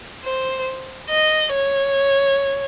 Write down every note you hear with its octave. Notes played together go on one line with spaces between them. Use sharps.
C5
D#5
C#5